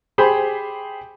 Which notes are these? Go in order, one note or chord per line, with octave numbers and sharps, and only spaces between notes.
G4 G#4 C5 B5